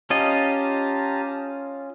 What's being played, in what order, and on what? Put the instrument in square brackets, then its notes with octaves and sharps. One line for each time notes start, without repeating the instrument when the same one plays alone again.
[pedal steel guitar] C#4 F4 D#5 [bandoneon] G4 A5 A#5